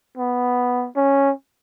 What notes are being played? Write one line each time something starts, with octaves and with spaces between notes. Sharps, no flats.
B3
C#4